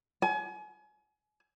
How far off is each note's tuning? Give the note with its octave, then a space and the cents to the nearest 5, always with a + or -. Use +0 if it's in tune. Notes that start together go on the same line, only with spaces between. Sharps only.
G#5 +35